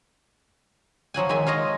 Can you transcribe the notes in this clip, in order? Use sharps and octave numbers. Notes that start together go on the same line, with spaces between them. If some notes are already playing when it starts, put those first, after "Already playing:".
F3 F#3 F#5 G#5
D#3 G#3 E5 G#5
F4 C#5 D#5 F5